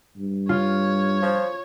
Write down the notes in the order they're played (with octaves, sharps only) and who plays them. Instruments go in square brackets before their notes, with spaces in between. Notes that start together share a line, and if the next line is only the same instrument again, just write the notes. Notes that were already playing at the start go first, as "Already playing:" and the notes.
[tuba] G2
[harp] F4 [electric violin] C#5
[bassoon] F3